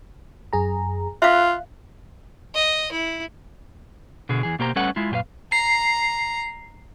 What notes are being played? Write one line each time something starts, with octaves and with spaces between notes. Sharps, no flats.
F#2 G#4 A#5
F4 E5 F5 F#6
D#5
E4
B2 D3 G#4
E2 E3 G#4
B2 A#3 G4 C5 A#5
G3 A3 C#4 A4 B4 F#5
G#3 E4 F4
F#2 A#2 G4 B4 F5
A#5 C7